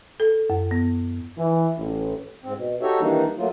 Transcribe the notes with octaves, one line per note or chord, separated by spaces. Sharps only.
A4
F#2
B3
E3
A1
G#2 C4
B2
D#4 F#4 G4 A4 C#5 E5
D#3 E3 G3 A#3 D4 D#4
F#3 A3 A#3 F4